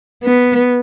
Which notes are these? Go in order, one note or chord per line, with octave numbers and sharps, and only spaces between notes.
B3